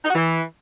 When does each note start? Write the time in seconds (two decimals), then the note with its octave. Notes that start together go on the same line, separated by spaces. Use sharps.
0.04 D#4
0.09 F#4
0.14 E3